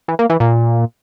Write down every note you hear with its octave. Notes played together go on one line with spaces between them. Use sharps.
E3
A#3
E3
A#2